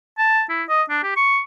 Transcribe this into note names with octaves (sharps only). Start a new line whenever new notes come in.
A5
E4
D#5
D4
G4
C#6